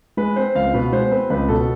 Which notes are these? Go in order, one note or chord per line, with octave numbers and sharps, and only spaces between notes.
G#3 B4
C4 C5
C#2 F5
B2 B4
G#3 C5
C4 B4
C#2 B4
B2 A4